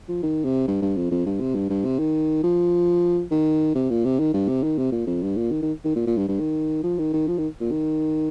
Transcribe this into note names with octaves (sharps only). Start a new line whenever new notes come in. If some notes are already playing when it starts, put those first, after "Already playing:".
F3
D#3
C3
G2
G2
F2
F2
G2
C3
G2
G2
C3
D#3
F3
D#3
C3
A#2
C3
D#3
G2
C3
D#3
C3
A#2
F2
G2
A#2
D#3
D#3
D#3
A#2
A#2
G2
G2
D#3
F3
D#3
D#3
F3
D#3
A#2
D#3